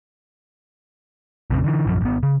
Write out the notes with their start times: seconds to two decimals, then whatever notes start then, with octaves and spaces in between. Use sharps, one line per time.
1.50 A#1 F2 C#3 C4
1.64 D3 E3
1.87 A#1 F#2 F3 F#3
2.01 G#1 B3
2.23 C#3